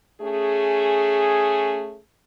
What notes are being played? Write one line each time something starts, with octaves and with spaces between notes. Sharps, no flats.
A3 C#4 G#4